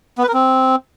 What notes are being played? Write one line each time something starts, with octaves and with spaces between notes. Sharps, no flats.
B3
B4
A#4
C4